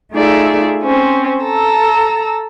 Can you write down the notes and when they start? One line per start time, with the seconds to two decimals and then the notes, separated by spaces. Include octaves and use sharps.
0.14 A3 D#4 F4 G#4 D5 E5
0.82 C4 C#4 C5
1.43 A4 A5 A#5 E6